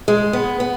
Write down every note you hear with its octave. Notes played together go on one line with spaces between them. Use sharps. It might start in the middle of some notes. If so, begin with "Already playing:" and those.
G#3
B3
B3